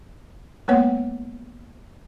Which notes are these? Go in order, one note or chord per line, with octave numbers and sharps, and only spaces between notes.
G#3 A#3 B3 B4 C#5 F#5